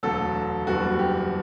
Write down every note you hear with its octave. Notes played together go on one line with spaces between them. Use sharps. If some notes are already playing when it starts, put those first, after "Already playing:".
E1 D2 D3 F#3 A4
F#1 E2 D3 G3 F#4
G4